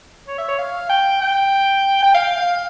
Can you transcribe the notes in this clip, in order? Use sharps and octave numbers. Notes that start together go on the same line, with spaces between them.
C#5
E5
C#5
F5
G5
G5
G5
F5
F5